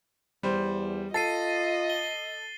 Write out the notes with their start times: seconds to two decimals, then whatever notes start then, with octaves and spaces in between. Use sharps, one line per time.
0.43 E2 G3 C5
1.14 F4 A4 D#5 A6 C7 D#7
1.90 G7